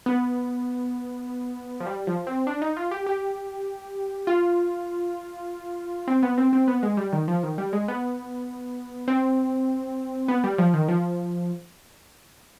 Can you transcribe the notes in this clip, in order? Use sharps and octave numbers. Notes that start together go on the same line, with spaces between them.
B3
F3
G3
F3
C4
D4
D#4
F4
G4
G4
F4
C4
B3
C4
C4
B3
G#3
G3
D#3
F3
D#3
G3
G#3
B3
C4
B3
G3
F3
D#3
F3